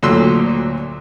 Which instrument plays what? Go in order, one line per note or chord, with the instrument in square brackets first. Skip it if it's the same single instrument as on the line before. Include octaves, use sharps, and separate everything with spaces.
[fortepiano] D2 A#2 D3 F#3 C6 E6